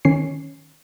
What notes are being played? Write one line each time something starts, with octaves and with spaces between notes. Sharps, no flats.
D#3 C#4 C7